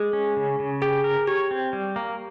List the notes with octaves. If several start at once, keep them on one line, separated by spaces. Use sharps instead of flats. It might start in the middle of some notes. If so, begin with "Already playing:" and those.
Already playing: G#3 G#4
C#4
C#3
C#3
G4 G#4
A#4
G4 C#5
C4
G3
A#3